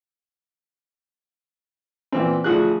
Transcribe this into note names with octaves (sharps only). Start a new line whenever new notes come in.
A#2 E3 C4
D2 F3 F#4 G#4 F#6